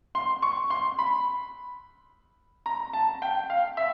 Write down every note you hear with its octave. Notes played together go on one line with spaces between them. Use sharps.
C6
C#6
C6
B5
A#5
A5
G5
F5
E5